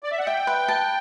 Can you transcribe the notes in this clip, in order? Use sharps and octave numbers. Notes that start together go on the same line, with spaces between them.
D5
E5
F#5
E5 G5
B4
A5